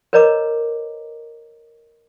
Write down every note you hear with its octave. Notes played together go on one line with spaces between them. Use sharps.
A#4 B4 C#5 D#5 A#5 D6